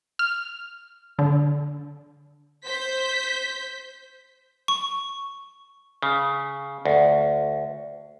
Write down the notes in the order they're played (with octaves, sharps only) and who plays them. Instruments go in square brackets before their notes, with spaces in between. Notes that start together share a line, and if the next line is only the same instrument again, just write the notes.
[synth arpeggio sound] F6
D3
[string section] C5 G6 B6
[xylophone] C#6
[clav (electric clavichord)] C#3
D2